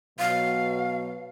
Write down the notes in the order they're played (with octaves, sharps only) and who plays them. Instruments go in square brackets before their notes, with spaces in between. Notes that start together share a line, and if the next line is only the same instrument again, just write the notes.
[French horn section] B2 F#3 [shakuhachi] F5